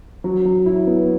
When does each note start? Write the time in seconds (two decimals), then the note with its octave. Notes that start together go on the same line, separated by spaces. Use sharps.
0.24 F#3
0.45 F#3
0.66 E4
0.87 B3